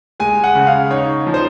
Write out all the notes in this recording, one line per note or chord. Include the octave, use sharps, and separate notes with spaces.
G#3 G#5
F#5
C#3
F5
D#4 C#5
F3
C5